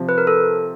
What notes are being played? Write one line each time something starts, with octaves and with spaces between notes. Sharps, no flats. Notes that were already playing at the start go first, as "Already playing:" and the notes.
Already playing: C3 F3
B4
A#4
A4